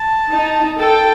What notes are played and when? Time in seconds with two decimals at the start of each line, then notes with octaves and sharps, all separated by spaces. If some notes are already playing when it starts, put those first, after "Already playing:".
Already playing: A5
0.33 D#4
0.79 A4 G5